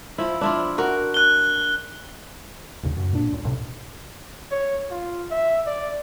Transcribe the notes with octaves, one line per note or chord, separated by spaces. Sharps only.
F3 E4
D4 E4 F4
F#4 A#4
F#6 G7
A1 D#2 C#3
F#2
A#2 D4
C#2
B1 A2 C3
C#5
F4
E5
D5